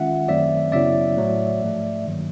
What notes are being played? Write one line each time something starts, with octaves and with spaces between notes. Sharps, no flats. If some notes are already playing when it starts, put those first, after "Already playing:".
Already playing: D#3 G#3 C#4 F4 E5 F#5
F#2 D#3 F#3 A3 C4 D5 E5
F#2 C#3 F#3 B3 E4 D5 E5
A2 F#3 A3
G#2 F3 A3
G2 D#3 F#3 A#3